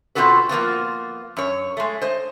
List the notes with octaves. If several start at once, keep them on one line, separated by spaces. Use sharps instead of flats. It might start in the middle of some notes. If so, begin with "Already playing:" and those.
B2 C4 F4 F#4 A4 B4
F3 A#3 B3 F4
F#2 C#5
G#3 A3
C5 D#5